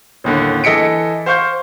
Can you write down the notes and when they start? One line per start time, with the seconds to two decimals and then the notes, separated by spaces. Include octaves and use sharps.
0.24 A1 D#2 D3
0.64 E3 A4 D#5 B6 C#7 D7
1.26 C5 F5 C#6 G6